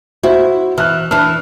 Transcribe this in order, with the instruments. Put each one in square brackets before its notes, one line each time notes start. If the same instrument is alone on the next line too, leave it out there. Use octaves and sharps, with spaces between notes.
[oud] E4 [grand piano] F#4 C5
[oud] E3 [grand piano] F6 F#6
[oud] E3 D4 [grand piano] F6